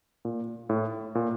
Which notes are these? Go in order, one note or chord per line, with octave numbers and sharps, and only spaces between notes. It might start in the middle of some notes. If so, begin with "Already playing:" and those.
A#2
A2
A#2